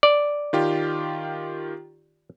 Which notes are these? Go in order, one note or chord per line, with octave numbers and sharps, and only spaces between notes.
D5
D#3 F4 G4